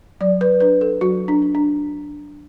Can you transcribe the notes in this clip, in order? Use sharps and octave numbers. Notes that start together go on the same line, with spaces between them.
F#3 D5
B4
D4 B4
A4
F#3 F#4
D4
D4
D4